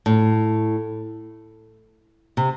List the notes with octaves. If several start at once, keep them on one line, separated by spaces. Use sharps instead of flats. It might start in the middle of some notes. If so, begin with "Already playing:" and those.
A2
C3